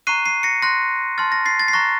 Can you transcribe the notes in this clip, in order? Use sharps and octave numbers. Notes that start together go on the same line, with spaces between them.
A#5 C#6 F#6 C7 D#7
C7 D#7
A#6 C#7
C6 F#6 A#6
A5 C6 F6 A6
A#6
A6 C7
A6
C7
A#5 C#6 F#6 A#6